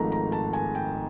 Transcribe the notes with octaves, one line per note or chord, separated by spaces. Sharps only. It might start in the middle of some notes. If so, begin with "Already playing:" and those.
Already playing: G#1 G#2 F3 A3 A#5
A#5
A5
G#5
G5